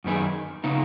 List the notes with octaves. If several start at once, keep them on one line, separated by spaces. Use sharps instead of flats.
F#2 D#3 B3 D#4 G#4
C#3 B3 D#4